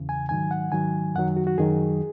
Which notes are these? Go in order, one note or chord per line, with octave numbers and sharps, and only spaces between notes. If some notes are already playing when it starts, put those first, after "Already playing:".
Already playing: E2 C#3 E3
G#5
G#2 D#3 F#3 G#5
F#5
G#2 D#3 F#3 G#5
F#2 D#3 F#3 F#5
F#4
F#4
F#2 D#3 F#3 G#4